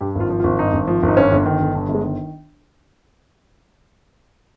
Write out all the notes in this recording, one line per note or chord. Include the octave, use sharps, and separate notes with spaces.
G2 G4
G#1 F4
F3
F4
G#1
G2 D#4
G#1
F3
G#1 D#4
G2 C#4
G1
D#3
G1
G2
G1
G#3
D#3